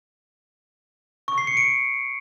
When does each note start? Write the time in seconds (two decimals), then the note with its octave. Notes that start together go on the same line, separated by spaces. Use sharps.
1.28 C#6
1.38 C7
1.47 C#7
1.57 D7